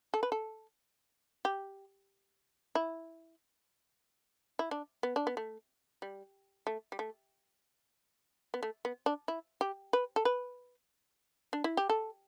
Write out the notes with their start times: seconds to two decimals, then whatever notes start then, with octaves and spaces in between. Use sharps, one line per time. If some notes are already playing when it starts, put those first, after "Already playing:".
0.14 A4
0.23 B4
0.32 A4
1.45 G4
2.75 E4
4.59 E4
4.71 D4
5.03 B3
5.16 D4
5.27 B3
5.37 A3
6.02 G3
6.67 A3
6.92 G3
6.99 A3
8.54 B3
8.63 A3
8.85 B3
9.06 D4
9.28 E4
9.61 G4
9.93 B4
10.16 A4
10.25 B4
11.53 D4
11.64 E4
11.77 G4
11.89 A4